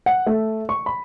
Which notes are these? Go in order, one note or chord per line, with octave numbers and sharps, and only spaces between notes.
F#5
A3
C#6
B5